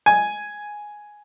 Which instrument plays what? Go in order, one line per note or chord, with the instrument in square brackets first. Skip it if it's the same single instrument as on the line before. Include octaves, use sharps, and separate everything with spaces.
[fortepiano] G#5